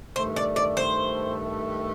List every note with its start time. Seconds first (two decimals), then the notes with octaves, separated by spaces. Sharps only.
0.15 G2 D#3 A3 C5
0.36 D5
0.56 D5
0.77 C5